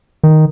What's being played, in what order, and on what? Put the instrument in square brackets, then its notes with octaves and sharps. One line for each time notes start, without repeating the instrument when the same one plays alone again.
[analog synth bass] D#3